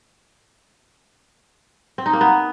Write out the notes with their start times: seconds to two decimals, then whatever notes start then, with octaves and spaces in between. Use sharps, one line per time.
1.98 C4
2.06 D#4
2.13 A#3
2.21 B3